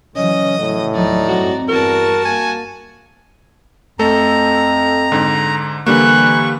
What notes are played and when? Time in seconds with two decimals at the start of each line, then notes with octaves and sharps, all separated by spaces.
0.16 C#3 E3 F#3 C#4 D#5 D#6
0.59 A2
0.94 D#2 F3 F#3 D#4 D5
1.28 G2 C4 F#4
1.69 E2 G2 F#4 A#4 A5
2.25 A#3 G#5
3.99 F2 A3 A4 A#5
5.12 G#2 D3
5.86 D3 E3 G3 A#3 C#6 F#6